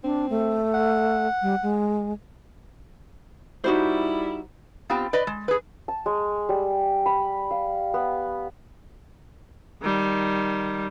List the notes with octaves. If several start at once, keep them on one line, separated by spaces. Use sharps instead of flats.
C4 D4
A3
F#5
G3
G#3
G3 D#4 E4 F#4 C5
B3 C4 F4 G4 G5
B4 D5 D#5
G#3
G#4 B4
A5
G#3
G3
B5
F5
B3
D#3 G3